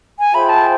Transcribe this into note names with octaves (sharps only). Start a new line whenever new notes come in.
G#5
F4 G#4 C5 E5 G5 B5
A5